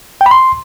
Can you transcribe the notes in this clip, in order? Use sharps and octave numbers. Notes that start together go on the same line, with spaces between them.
G5
B5
C6